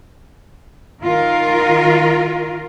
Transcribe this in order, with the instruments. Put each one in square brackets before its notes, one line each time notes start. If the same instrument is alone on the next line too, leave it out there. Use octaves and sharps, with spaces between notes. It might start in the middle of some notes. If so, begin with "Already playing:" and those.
[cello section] D#3 F4 A#4